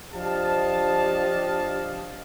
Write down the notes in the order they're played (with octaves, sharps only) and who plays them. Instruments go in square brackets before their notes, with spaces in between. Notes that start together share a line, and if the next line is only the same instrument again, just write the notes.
[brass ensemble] F3 D4 G4 D#5 F5 A5